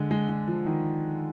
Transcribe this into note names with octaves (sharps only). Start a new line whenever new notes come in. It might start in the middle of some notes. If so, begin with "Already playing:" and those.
Already playing: D3 G#3
G#3
G#3
F3
D#3